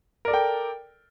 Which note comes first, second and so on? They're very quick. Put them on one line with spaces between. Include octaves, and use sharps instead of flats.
A#4 D5 A4 G5